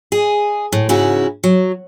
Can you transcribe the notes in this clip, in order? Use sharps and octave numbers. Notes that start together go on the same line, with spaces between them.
G#4 D#5
A2
G#2 C#3 C#4 E4 F#4
F#3